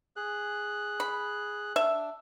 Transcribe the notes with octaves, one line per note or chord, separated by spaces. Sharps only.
G#4 F#6
B5
D4 E5